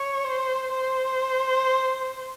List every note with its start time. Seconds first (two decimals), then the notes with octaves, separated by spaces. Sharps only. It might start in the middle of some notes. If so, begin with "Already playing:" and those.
Already playing: C#5
0.24 C5
0.72 C5